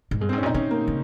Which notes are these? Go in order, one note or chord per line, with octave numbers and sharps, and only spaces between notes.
G#2
G2 G#3
C4
G#2
C#4
A#2 D#4
C3 C#4
A#3
C#3